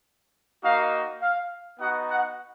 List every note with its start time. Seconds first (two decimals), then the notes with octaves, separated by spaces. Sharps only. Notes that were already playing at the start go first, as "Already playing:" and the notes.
0.63 A#3 D#4 F#4 F5
1.21 F5
1.80 B3 D#4 F#4 F#5
2.09 F#5